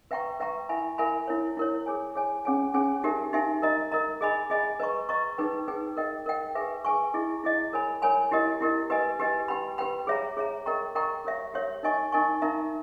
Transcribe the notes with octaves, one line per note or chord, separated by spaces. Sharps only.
B4 E5 G5 A#5 C#6
B4 E5 G5 A#5 C#6
E4 A#4 E5 G#5 B5
E4 A#4 E5 G#5 B5
E4 A#4 C#5
E4 A#4 C#5
G#4 C#5 G#5
G#4 C#5 G#5
C#4 G#4 C#5 G#5
C#4 G#4 C#5 G#5
D#4 G4 A#4 E5 G#5
D#4 G4 A#4 E5 G#5
A#4 D#5 A#5
A#4 D#5 A#5
G#4 D#5 G#5 B5
G#4 D#5 G#5 B5
B4 D#5 A#5 C#6
B4 D#5 A#5 C#6
D#4 G#4 B4 G5
D#4 G#4 B4 G5
A#4 D#5 G5
A#4 D#5 G5
G#4 B4 E5 G#5 C#6
G#4 B4 E5 G#5 C#6
E4 G#4 D#5
E4 G#4 D#5
A#4 C#5 G#5 B5
A#4 C#5 G#5 B5
E4 G4 A#4 D#5
E4 G4 A#4 D#5
G4 B4 D#5 G#5
G4 B4 D#5 G#5
G4 B4 G5 B5
G4 B4 G5 B5
G#4 C#5 E5 A#5
G#4 C#5 E5 A#5
A#4 D#5 G5 A#5 C#6
A#4 D#5 G5 A#5 C#6
G4 A#4 C#5 E5
G4 A#4 C#5 E5
D#4 A#4 D#5 G#5 C#6
D#4 A#4 D#5 G#5 C#6
D#4 A#4 E5 A#5